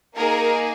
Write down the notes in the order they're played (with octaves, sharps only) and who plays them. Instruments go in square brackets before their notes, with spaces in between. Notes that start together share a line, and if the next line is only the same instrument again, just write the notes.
[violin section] A#3 D#4 G#4 A#4